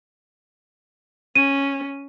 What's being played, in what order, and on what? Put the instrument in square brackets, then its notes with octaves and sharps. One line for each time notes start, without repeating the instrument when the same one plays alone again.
[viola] C#4 [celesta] D#7